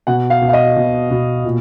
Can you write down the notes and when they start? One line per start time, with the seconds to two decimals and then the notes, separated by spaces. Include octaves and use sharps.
0.07 B2 F#5
0.30 F5
0.41 B2
0.49 F5
0.53 D#5
0.76 B2
1.10 B2
1.45 A#2